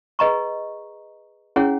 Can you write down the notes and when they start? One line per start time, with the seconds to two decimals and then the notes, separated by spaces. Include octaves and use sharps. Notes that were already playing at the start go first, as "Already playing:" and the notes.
0.19 G#4 B4 D#5 A#5 C#6
1.56 C#4 E4 G#4 C#5 F#5